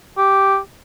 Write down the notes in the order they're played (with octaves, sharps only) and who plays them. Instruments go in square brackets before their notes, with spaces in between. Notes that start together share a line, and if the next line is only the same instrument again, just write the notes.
[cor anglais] G4